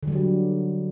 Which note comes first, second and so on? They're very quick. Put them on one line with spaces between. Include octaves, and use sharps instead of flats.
D3 G3 F#3